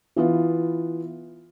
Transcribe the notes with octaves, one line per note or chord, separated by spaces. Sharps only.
E3 B3 F4